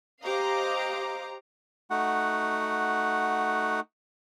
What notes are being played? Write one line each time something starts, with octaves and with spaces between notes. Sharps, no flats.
G4 C5 D#5 F5 A#5 D6
A3 D#4 F#4 F#5